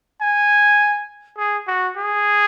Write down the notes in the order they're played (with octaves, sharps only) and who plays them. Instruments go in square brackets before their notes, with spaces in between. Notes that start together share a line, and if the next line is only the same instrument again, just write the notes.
[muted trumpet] G#5
G#4
F#4
G#4